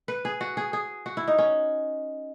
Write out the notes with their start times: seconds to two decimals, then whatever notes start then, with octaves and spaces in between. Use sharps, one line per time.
0.08 B4
0.25 G#4
0.41 F#4
0.57 G#4
0.73 G#4
1.06 F#4
1.17 E4
1.28 D#4
1.38 C#4